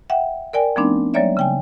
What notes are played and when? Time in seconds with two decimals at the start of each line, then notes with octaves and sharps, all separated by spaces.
0.10 E5 F#5 G5
0.53 A#4 D5 G5 G#5
0.76 F3 A3 B3 C4 D4 D#4
1.14 F#3 G3 A#3 C#5 D5 E5
1.37 C#3 G5 G#5